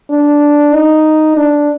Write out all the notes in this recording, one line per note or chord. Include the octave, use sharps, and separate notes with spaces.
D4
D#4
D4